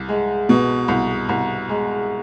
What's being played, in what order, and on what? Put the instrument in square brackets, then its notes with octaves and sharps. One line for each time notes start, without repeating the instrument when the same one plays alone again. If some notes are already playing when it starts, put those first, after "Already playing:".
Already playing: [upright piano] C2
G#3
B2
C2
C2
G#3